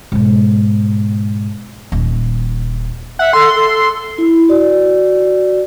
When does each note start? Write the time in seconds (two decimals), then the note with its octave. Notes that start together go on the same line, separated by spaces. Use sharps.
0.12 G#2 B2
1.92 D#1
3.19 E5 F#5
3.33 A4 C6
3.55 A4
4.18 E4
4.49 F#4 D5